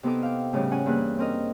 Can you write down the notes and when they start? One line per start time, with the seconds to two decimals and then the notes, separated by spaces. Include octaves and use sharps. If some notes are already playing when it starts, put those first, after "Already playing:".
0.03 C3 B3 D#4 A4 D6
0.22 F5 G5
0.53 A2 C#3 G3 C#4 G4
0.71 C#4 F#5 G#5
0.86 G2 E3 A#3 G#4 B4 F#6
1.19 C4 C#4 A#4 D#5